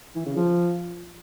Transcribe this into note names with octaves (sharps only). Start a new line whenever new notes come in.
E3
C#3
F3